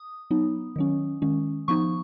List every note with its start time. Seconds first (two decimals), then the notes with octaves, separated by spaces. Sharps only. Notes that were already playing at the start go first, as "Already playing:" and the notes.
Already playing: D#6
0.31 F#3 B3 D#4
0.76 D#3 F#3 C#4
1.22 D#3 G#3 C#4
1.68 F3 B3 D#4 C#6